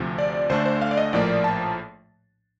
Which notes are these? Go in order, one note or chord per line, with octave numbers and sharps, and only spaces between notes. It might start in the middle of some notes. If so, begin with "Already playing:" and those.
Already playing: D2 C3 F3
D5
D2 D3 A3 D4 C5
C5
F5
D5
D#5
A#1 A2 F3 A#3 D5
A5